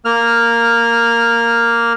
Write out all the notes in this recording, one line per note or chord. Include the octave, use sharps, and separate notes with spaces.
A#3 F6